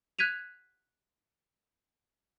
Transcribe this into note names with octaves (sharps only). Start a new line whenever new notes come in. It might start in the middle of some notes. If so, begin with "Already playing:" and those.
F#6 G#6 B6 D#7 F7